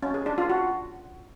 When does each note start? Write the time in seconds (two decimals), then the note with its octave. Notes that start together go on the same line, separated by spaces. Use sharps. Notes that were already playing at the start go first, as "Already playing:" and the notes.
0.03 C#4
0.14 G#4
0.26 D4
0.38 F4
0.50 F#4